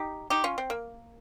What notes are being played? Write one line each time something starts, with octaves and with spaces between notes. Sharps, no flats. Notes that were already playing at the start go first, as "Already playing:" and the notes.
Already playing: D#4 G4
D#4 G4
C#4 F4
C4
A#3